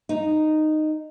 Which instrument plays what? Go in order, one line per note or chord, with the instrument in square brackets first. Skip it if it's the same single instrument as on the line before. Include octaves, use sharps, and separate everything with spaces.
[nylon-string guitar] D#4